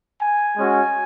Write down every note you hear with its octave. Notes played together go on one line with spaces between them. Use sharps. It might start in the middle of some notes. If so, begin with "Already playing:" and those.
G#5
G#3 C#4 F#4